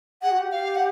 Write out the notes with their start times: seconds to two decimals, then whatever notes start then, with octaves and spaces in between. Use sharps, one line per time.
0.22 G#4 F#5
0.30 F#4
0.37 G4
0.52 F5
0.76 F#5